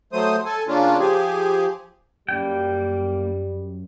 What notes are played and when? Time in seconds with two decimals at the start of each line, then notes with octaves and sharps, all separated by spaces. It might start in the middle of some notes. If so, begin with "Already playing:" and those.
0.13 F#3 A3 C5 D#6
0.45 A4 G#5
0.68 C#3 A#3 C#4 D4 F4
0.99 F3 G4 G#4
2.29 F#2 G3 A#3 G5